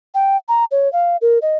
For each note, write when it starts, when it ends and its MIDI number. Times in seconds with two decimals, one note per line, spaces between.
0.15 0.37 79
0.48 0.65 82
0.71 0.91 73
0.93 1.17 77
1.22 1.39 70
1.42 1.58 75